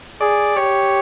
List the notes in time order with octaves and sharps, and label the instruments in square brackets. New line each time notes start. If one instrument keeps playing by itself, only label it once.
[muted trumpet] G#4 [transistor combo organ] D5
[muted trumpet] G4 [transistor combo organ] C#5